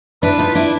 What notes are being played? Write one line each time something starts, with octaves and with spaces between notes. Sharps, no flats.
D4 E4 B4
D#4 F4
D4 E4